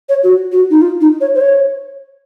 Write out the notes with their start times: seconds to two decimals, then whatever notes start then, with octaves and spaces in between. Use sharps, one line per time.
0.09 C#5
0.23 F#4
0.52 F#4
0.70 D#4
0.81 F4
1.01 D#4
1.21 C#5
1.35 C5
1.41 C#5